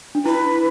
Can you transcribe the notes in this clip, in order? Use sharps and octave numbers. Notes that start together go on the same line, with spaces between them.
D4
E4 B4